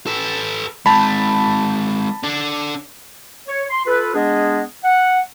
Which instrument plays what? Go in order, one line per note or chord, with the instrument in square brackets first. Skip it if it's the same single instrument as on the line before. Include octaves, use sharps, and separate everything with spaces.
[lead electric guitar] A4 B4
[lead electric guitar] G#3 C4 [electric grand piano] A5 B5
[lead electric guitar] D4 A4
[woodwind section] C#5
C6
F4 A4 B4
G#3 B3 D4 G#4 D#5
F#5